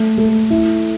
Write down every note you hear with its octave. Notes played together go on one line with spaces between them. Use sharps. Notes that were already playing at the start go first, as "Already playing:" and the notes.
Already playing: A3
A3
E4